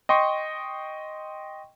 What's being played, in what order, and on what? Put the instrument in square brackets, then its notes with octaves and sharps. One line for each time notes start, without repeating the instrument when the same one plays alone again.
[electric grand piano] D#5 G5 C6 C#6